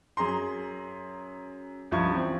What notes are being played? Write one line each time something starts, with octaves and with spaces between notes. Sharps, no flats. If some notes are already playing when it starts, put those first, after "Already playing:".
F#2 G#4 A#5 C6
C#2 G2 F3 E4 C#6 G#6
E3 C4